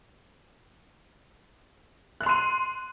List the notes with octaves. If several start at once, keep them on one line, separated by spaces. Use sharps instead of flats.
C6 F#6 D#7 F7